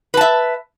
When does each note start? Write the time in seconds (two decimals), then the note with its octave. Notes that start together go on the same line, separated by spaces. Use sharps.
0.14 B4
0.17 A5
0.21 E5